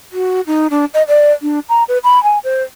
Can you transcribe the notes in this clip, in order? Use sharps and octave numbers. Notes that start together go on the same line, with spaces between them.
F#4
D#4
D4
D#5
D5
D4
A#5
B4
B5
G#5
C5